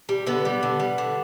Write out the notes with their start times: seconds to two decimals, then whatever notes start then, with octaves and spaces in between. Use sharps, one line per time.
0.09 G3
0.26 D3 B3
0.45 G3
0.63 D3
0.80 G3
0.98 D3